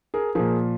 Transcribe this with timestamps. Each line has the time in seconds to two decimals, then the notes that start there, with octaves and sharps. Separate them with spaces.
0.14 G#4 A#4
0.35 A#2 F3 G#4 A#4